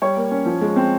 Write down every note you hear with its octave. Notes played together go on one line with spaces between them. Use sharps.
G3 C#5
A#3
C#4
F3
G#3
C4